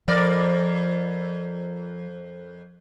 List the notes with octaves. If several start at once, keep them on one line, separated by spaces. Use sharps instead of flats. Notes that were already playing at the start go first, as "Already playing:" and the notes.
F2 F3 A#4 D5